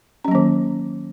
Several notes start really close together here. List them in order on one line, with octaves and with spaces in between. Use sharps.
C#4 F#3 A#3 D#3